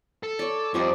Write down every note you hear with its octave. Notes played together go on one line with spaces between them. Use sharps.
A4
C#5 D5
F2 F3 G3 C4 D#4 D5